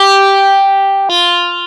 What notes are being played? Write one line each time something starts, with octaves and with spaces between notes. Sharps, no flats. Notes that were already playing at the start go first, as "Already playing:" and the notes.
Already playing: G4
F4